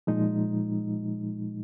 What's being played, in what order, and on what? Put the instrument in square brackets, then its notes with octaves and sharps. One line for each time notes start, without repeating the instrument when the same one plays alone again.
[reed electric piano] A#2 F3 G#3 D#4